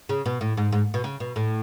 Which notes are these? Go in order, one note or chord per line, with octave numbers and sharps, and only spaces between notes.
C#3
B2
A2
G#2
G#2
B2
C#3
B2
A2